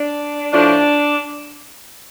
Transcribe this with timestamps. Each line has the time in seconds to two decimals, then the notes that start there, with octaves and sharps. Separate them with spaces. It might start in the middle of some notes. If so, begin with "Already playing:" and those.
Already playing: D4
0.52 A2 F3 A3 D4